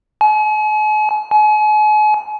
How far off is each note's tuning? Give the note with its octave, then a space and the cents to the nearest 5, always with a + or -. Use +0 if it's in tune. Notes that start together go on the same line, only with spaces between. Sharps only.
G#5 +45
G#5 +40